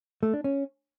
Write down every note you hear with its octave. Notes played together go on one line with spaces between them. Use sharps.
A3
D4
C#4